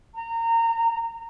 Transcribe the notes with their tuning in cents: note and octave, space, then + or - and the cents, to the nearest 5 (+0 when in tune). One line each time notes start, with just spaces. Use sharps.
A#5 -25